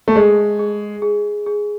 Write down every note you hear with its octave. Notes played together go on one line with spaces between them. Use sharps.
A3
G#3 G#4
G#4
G#4
G#4